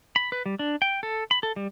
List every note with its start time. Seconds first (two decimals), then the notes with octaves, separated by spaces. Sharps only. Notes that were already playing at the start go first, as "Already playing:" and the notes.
0.16 B5
0.32 B4
0.46 G3
0.59 D4
0.82 G5
1.03 A4
1.31 B5
1.43 A4
1.56 G3